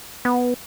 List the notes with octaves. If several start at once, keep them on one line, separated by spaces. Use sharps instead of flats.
B3